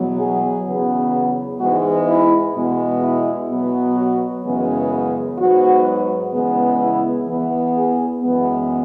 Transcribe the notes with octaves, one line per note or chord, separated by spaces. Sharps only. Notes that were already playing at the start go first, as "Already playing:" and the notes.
Already playing: E2 B2 F#3 B3
G#4
E2 C#3 F#3 B3
G#2 E3 G#3 B3 F#4
E4
E2 B2 G#3 B3
E4
B2 F#3 B3
F#4
F#2 C#3 E3 G#3 B3
G#2 F#3 B3 F#4
E2 C#3 G#3 B3
E4
E2 E3 B3
G#4
F#2 E3 G#3 B3